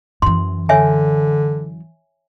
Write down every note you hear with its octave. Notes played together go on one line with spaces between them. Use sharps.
F#2 E3 C6
D3 C#5 E5 G#5